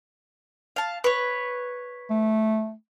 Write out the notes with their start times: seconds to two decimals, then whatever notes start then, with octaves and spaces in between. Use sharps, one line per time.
0.76 F5 A5
1.04 B4 C#5
2.10 A3